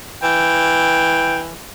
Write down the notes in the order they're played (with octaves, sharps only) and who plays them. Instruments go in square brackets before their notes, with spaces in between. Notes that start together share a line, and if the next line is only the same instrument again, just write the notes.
[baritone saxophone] E3 [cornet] G5